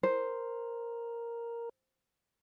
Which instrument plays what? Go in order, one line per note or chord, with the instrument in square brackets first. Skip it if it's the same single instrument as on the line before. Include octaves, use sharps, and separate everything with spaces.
[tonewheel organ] A#4 [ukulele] C5